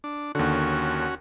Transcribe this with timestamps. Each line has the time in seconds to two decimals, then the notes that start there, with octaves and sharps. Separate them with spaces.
0.04 D4
0.35 D#2 D3 C#4 F#4